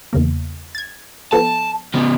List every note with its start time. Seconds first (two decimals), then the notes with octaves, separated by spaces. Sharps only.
0.13 E2 C#3 A#3
0.75 G#6 A6
1.33 F3 B3 A4 A5
1.94 C#3 B3